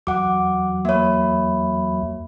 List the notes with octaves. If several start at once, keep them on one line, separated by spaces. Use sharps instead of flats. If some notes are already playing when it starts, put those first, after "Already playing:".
E2 F#3 F#5 D6
A#3 C#5 E5 B5